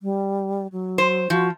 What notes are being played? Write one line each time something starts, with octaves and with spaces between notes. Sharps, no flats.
G3
F#3
C5
F3 F#4